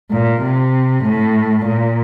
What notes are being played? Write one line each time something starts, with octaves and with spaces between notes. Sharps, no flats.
A#2
C3
A2
A#2